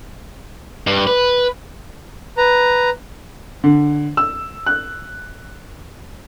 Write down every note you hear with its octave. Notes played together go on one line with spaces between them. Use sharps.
G2
B4
B4 A#5
D3
E6
F#6